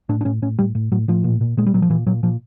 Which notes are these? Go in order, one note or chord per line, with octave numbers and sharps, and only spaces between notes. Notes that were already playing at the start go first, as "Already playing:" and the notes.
A2 D4
D4
A2 C#4
A2 C#4
A2 G3
A2
A2 F#3
A2 F3
A#2
A#2
A#2 G#3
G3
A#2 F#3
F3
A#2 E3
A#2 F#3
A#2 F3